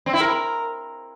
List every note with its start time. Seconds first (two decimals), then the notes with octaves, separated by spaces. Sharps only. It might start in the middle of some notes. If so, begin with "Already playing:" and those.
0.06 C4
0.13 E4
0.20 A#4